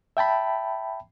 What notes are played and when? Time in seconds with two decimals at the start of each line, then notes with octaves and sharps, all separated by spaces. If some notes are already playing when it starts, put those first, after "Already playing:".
0.17 E5 G5 A5 B5